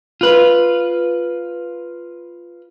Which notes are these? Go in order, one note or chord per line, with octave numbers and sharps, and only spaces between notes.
F4 B4